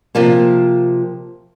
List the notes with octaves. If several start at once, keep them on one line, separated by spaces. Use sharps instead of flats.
C3 F3 A#3